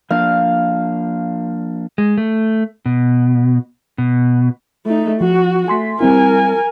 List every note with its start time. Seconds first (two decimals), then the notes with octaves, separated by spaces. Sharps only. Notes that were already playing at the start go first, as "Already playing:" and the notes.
0.10 F3 A#3 D4 F5
1.98 G#3
2.18 A3
2.86 B2
3.98 B2
4.86 A3 D#4
5.21 F3 F#4
5.68 A3 G#5 C6 B6
6.01 G3 C4 E4 A#4 G#5